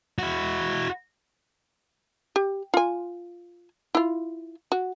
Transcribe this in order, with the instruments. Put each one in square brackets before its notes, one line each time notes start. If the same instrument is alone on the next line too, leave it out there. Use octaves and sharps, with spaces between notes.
[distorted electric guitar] E4 F#4
[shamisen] G4
F4 G#5
E4 F4
F#4